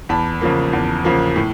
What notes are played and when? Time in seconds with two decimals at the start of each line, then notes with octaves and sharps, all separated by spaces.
0.09 E2 A5 B5
0.41 C#3 F3 A#3
0.73 E2
1.05 C#3 F3 A#3
1.36 A2